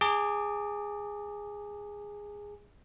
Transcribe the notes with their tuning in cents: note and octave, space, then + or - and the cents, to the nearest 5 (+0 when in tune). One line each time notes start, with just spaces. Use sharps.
G#4 -10 A5 +40 D6 +0